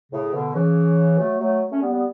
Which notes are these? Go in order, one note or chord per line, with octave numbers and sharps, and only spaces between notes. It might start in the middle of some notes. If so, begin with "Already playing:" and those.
A2 C#3
B2 D3
C#3 E3
F#3 A3
F#3 A3
A3 C#4
G3 B3
G3 B3